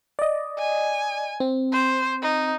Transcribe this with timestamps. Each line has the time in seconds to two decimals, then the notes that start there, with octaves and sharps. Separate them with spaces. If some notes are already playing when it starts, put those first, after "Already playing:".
0.19 D5 D#5
0.59 G#5
1.40 C4
1.72 C5
2.22 D#4